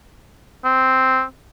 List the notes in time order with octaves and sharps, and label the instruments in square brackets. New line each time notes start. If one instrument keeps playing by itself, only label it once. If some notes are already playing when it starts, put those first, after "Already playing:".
[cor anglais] C4